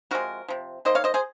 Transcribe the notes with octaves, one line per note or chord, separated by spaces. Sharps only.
C3 F3 G#3 F#4 A#4
C3 F3
D#3 A#3 C5 D#5
C#5 F5
C5 D#5
G#4 C5